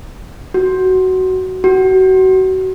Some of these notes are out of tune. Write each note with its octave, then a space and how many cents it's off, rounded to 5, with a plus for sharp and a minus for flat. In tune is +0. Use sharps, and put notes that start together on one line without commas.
F#4 +15
F#4 +30